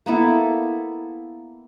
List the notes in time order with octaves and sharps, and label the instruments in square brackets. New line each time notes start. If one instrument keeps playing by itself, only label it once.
[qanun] A#3 B3 E4 A4